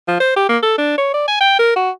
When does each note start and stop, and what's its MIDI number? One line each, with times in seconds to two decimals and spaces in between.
0.08 0.19 53
0.20 0.35 72
0.36 0.45 67
0.49 0.58 58
0.63 0.77 69
0.78 0.96 62
0.98 1.10 73
1.14 1.28 74
1.28 1.39 80
1.41 1.57 79
1.59 1.75 70
1.76 1.90 66